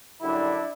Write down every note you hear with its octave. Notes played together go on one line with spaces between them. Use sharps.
F#2 D3 G3 D4 E4